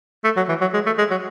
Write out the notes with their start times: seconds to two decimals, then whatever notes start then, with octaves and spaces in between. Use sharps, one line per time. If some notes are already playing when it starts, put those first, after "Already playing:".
0.24 A3
0.37 F#3
0.49 E3
0.61 F#3
0.74 G#3
0.86 A3
0.98 G#3
1.11 F#3